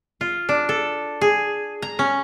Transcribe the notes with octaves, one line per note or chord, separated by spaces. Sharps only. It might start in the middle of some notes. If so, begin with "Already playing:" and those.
F4
D4
A4
G#4
A#5
C#4